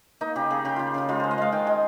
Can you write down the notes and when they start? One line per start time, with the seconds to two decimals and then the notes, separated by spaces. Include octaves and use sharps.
0.21 A#3 D#4
0.36 C#3 G4
0.50 C#3 G#4
0.65 C#3 G4
0.76 C#3 F4
0.94 C#3 F4
1.09 G#3 F4
1.20 G#3 C5
1.31 D#5
1.38 G#3 F5
1.52 D#3 G5
1.67 G#3 G#5